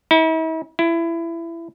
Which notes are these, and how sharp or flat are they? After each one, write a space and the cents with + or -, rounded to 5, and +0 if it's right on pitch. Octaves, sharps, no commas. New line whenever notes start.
E4 -45
E4 +20